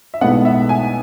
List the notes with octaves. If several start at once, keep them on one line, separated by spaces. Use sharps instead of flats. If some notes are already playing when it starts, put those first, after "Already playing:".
E5
B1 A2 G#3 B3 F#5
E5
G#5